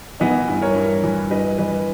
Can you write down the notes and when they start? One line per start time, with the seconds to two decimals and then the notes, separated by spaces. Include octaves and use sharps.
0.20 E3 B3 D#4
0.48 G2
0.61 A#4 C#5
0.76 G2
1.04 E3
1.31 G2 B4 D#5
1.58 E3 B4 D#5